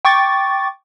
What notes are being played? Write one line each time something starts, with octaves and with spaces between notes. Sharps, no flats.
G5 C#6 D6 A6